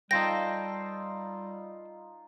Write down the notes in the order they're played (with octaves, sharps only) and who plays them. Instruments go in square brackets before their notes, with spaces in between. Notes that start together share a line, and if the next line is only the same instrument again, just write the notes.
[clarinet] G3 [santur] D#4 F4 F5 [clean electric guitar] A4 C5 G5 [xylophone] A#6